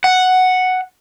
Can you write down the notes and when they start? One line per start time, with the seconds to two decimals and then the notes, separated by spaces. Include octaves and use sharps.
0.04 F#5